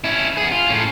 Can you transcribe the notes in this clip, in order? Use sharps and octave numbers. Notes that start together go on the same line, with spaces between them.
C#4 E4
B3 G#4
F4
A2 C#4